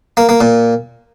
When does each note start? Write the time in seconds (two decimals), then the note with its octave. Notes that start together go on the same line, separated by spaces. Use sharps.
0.17 A#3
0.29 A#3
0.41 A#2